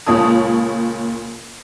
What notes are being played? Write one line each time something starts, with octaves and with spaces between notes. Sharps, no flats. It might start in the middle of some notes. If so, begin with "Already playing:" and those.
C#2 A#2 C#5 A5 D#6